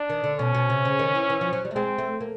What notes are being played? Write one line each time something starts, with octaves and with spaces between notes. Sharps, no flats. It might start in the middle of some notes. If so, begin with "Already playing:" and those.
Already playing: D4
D#3
D3
B2 C#4
B2
C3
C#3
D#3
E3
E3
F3
F#3
G3
A3
G#3 C4
A3
A#3